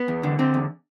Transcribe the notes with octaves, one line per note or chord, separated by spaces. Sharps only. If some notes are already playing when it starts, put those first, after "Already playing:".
Already playing: B3
E2
D3
D3 C4
E2